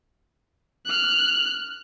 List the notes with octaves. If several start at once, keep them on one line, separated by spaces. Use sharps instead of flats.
F6 F#6